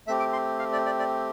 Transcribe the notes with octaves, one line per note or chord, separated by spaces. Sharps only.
A3 C4 G4 E5
D6
C6
F5
D5
D5
D5